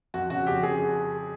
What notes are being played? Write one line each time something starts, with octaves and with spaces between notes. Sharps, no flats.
F2 F#4
C#3 F#4
F2 G4
G#4